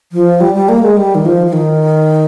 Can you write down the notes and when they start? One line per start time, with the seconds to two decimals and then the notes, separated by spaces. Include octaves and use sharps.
0.12 F3
0.40 G3
0.55 G3
0.69 A#3
0.83 G#3
0.97 G3
1.15 D#3
1.25 F3
1.46 F3
1.53 D#3